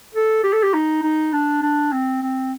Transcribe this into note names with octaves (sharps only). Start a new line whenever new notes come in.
A4
G4
A4
G4
D#4
D#4
D4
D4
C4
C4